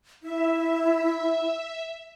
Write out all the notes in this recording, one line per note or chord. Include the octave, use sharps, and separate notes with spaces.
E4 E5